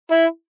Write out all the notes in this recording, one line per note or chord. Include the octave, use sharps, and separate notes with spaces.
E4